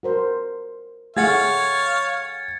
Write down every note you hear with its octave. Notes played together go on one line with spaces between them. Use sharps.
F#4 A#4 C5
A3 G#4 C#5 F5 F#5 G#6 A6 C#7